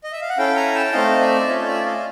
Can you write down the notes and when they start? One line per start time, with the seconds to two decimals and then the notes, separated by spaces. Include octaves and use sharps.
0.04 D#5
0.12 E5
0.21 F5
0.29 F#5
0.37 C#4 E4 A4 F5 G5
0.56 G#5 A#5
0.75 G5 A5
0.93 A3 C4 D#4 D#5 F5
1.21 D5 E5
1.48 A3 C#4 F4 C#5 D#5
1.67 D5 E5
1.85 D#5 F5